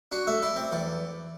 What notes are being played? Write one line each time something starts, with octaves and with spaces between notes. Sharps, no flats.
D4 F#4
A3 E5
E4 D5
C4
E2 D5